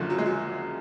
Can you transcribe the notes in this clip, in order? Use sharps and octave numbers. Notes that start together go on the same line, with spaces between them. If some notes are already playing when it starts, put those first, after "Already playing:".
Already playing: F#1 F#2 D3 F3
F#3
G#3
F#3